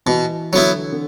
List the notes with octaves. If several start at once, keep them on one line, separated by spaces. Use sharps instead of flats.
B2 E3
D3 F#3 B3 E4
D3